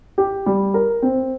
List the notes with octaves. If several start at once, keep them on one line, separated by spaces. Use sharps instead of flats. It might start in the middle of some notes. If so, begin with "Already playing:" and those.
G4
G3
A#4
C4